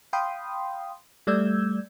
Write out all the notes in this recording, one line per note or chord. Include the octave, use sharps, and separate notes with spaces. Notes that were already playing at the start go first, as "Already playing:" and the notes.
F5 G5 B5 C6 D#6
G3 A3 D5 E6 G6 G#6